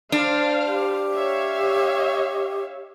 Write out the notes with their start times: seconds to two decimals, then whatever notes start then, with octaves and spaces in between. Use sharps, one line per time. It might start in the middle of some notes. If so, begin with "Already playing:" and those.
0.12 D4 C5 F5
0.66 G4
1.15 C#5 E5 F5